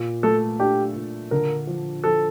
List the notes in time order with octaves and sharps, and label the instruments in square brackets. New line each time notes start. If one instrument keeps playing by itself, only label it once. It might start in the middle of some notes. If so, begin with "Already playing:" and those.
Already playing: [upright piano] A#2
[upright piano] A3 [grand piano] A4
[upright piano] D4 [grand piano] G4
[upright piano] A#2
[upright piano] D3 [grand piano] A#4
[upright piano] F3
[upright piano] F3 [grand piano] A4